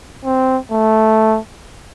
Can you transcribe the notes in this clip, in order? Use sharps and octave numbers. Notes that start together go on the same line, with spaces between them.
C4
A3